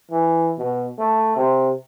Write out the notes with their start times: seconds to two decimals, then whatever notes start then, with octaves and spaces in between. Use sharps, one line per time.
0.11 E3
0.59 B2
0.98 A3
1.36 C3